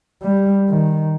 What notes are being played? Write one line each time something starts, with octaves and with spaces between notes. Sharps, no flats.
G3
D#3